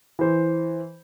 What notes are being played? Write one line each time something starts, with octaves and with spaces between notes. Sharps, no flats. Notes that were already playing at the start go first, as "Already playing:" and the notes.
E3 C5